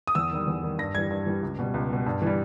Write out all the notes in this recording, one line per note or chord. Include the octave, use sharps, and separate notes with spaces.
D#6
E2 E6
D#3 G3
E2
D#3 G3
G2 A#6
E3 G3 G#6
G2
E3 G3
C#2
B2 G3
C#2
B2 G3
G2
E3 G3